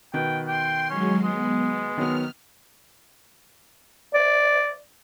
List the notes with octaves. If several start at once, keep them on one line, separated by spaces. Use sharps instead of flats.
B2 D#3 B4 G5
G5 C6
F#3 G#3 C#4
G#3 B3
D#3 F#3 B3 F6
D5